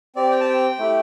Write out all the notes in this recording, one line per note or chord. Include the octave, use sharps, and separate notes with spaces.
C4 G4 D5
G5
A5
G5
A3 E4 G4